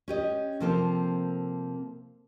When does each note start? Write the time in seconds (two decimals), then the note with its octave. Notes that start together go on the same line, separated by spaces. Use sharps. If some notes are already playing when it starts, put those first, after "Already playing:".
0.08 C#4 G4 D#5
0.60 C3 F3 A#3 C4 A4